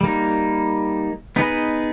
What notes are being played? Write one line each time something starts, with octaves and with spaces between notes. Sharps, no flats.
G3 A#3 D#4
B3 D#4 G#4 B4 D#5